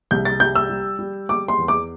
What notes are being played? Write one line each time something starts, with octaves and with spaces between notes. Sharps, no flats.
C2 G6
A6
G3 G6
E6
G3
G3
G3 D6
C6
E2
D6